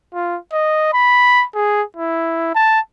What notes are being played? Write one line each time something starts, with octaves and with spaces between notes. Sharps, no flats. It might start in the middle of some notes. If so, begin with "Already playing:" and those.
F4
D#5
B5
G#4
E4
A5